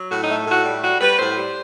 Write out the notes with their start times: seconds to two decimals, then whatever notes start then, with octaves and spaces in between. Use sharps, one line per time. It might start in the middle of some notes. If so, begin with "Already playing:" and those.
Already playing: F#3
0.10 A2 F#4
0.24 A3 D#4
0.47 A2 F#4
0.65 G3
0.82 G3 F#4
1.00 G3 B4
1.18 A2 C5
1.36 G3